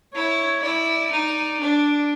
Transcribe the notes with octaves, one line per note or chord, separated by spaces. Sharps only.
E4 C#5
E4 D5
D#4
D4